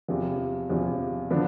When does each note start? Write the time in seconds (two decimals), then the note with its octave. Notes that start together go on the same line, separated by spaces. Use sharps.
0.08 E2 C3 F3
0.69 E2 C3 F3
1.30 D3 F3 B3 D4